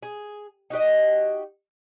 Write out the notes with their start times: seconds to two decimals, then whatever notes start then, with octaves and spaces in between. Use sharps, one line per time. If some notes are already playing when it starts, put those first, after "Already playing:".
0.03 G#4
0.70 D#4 F#4 G4 D#5